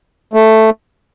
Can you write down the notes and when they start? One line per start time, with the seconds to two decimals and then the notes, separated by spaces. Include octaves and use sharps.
0.33 A3